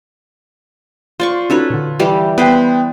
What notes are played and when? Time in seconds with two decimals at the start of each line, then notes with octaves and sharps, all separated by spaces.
1.20 F4 C5 D5 C#6
1.50 C#4 D#4 F#4 A4 B4 C#5
1.70 A#2 D3
1.99 E3 G3 G4
2.38 B3 B4 C5 G5